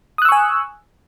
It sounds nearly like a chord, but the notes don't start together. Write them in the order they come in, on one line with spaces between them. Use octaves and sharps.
D#6 F#6 E6 C#6 G#5